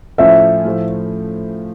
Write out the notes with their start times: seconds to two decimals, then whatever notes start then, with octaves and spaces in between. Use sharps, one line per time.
0.18 A2 F3 C#4 F4 A4 E5
0.65 A2 F3 A3